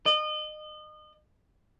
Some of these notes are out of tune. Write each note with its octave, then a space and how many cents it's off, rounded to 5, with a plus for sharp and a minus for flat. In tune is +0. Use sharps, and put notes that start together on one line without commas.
D#5 -30